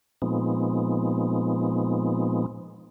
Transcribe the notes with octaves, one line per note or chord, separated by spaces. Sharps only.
A#2 F3 G#3 B3 C4 D#4